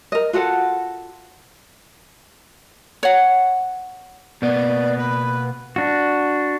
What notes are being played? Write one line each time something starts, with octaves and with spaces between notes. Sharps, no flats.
A#4 D#5
F4 F#4 A4 F#5
C#5 F#5
B2 A#3 B3 D5
B4
D4 F#4